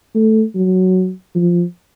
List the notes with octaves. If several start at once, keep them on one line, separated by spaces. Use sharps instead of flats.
A3
F#3
F3